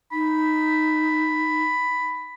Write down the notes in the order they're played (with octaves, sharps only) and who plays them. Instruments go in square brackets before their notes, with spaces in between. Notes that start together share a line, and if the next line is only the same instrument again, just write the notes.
[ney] D#4 [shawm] B5